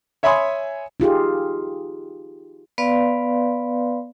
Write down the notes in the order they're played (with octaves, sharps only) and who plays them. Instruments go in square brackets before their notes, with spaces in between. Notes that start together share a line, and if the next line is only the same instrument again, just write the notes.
[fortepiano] C#5 E5 G#5 B5 C6 D#6
[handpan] D#4 F4 G4 G#4
[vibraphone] B3 B4 D5 F5 C6